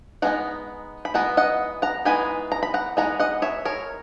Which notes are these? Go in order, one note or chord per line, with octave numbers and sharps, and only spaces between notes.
E3 G#3 B3 D#4 F#5 A#5
B5
E3 G#3 B3 D#4 F#5 A#5
D#5 F#5
F#5 A#5
E3 G#3 B3 D#4 G#5 B5
A#5
B5
F#5 A#5
E3 G#3 B3 D#4 F#5 A#5
D#5 F#5
C#5 E5
A#4 C#5